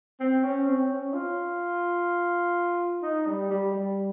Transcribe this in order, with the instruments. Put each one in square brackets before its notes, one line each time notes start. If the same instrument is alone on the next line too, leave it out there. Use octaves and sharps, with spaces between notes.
[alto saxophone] C4
C#4
C4
C#4
F4
D#4
G3
G3
G3